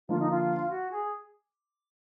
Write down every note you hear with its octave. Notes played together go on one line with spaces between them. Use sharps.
D3 F3 A#3 F4
D#4
F4
F#4
G#4